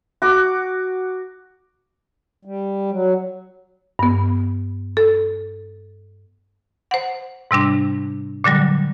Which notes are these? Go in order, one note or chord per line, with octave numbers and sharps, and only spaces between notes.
F#4 D6
G3
F#3
G2 B3
A4
C5 F#5
G#2 C3 G3 D4
A#2 D3 F#3 G3